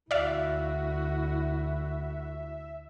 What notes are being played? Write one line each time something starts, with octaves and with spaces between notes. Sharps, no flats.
D2 E4 F#4 D5 E5 F5